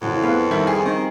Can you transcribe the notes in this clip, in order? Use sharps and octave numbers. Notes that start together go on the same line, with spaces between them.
F2 C#3 E3 F#3
B3 G#4 B4 F5
D#3 G3 E4
G#4 G5
D#3 C4 D#4